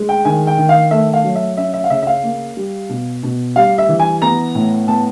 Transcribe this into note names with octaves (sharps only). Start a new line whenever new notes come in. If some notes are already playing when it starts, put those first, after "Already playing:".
Already playing: G#3
G5
D#3 G#5
G5
D#3
F5
A3 E5
F5
F#3
E5
C#4 E5
E5
F5
C#3 E5
E5
F5
A#3
G3
B2
B2
G3 F5
E5
E3
G#5
B3 A#5
A2
B3 A5